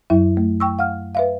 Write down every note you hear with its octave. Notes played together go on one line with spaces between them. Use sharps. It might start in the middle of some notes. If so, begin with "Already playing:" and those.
F#2 F#3 E4 E5
A3
G5 C#6 E6
F5 F#5 F6
B4 E5 F5